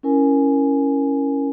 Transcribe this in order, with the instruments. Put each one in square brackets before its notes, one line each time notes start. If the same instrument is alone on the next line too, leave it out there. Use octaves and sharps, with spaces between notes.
[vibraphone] C#4 E4 A#4 G#5